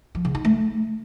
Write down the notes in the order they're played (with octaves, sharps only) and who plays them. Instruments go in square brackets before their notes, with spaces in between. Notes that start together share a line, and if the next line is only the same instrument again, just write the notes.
[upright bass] F3
C#3
D#4
A3